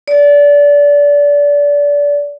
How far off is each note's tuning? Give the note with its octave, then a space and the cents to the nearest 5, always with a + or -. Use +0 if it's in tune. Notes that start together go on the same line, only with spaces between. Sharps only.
D5 -25